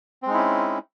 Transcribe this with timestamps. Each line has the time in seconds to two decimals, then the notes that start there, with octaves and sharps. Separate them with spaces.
0.23 C4
0.26 G#3
0.30 D#4
0.34 E4
0.37 C#4